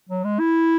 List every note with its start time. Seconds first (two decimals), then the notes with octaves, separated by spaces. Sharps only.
0.09 F#3
0.24 G#3
0.40 E4